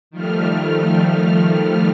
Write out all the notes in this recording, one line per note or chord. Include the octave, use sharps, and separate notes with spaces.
D#3 F3 G3 A3 F6